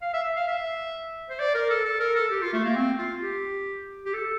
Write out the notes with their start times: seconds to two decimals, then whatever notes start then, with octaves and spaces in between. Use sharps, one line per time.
0.02 F5
0.14 E5
0.36 F5
0.48 E5
1.30 C5
1.39 D5
1.55 A#4
1.70 A4
1.85 A4
2.00 A#4
2.15 A4
2.31 G4
2.41 F4
2.53 A3
2.65 A#3
2.76 C4
2.99 F4
3.22 G4
4.06 G4
4.13 A4